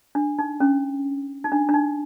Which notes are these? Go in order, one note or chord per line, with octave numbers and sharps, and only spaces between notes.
D4
D#4
C#4
D#4
D4
D4
D#4